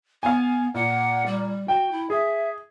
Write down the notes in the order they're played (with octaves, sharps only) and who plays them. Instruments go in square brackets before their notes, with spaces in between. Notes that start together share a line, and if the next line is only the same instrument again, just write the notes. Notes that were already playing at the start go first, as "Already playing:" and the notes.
[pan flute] B3 [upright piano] F5 G#5
[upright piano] A#2 [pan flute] F#5
[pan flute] G3
[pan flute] F#4 [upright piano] G5
[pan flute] E4
[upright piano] G#4 [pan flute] E5